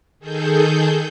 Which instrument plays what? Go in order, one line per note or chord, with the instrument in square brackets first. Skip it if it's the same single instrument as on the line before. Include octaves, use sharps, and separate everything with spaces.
[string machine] D#3 G#4 A4 G6